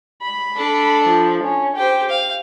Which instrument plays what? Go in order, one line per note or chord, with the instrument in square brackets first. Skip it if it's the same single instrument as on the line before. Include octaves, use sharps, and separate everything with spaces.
[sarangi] B5
[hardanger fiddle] D4 A4
[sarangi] F3
C#4
[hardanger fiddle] G4 C5 [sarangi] G5
[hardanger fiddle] F5